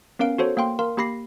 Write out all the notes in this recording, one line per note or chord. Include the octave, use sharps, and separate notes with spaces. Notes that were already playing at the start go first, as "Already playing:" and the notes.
B3 C#4 A#4 F5 D7
F#4 A4 C5 C#5
A#3 F5 G5 C6
A#4 F5 C6
A#3 G4 B5 A#6 C7